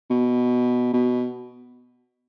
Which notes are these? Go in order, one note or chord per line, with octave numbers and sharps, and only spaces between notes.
B2
B2